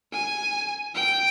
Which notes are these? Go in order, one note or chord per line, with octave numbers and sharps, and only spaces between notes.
G#5
G5